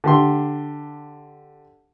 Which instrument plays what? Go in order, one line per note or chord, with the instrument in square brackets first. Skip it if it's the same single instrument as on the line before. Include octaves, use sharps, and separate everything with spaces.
[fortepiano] D3 G4 C6